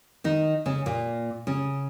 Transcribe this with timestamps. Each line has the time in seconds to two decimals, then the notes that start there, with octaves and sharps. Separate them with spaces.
0.24 D#3 D#4
0.66 C#3 C#4
0.86 A#2 A#3
1.47 C#3 C#4